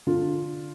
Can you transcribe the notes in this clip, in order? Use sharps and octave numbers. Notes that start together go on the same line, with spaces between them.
D3 F4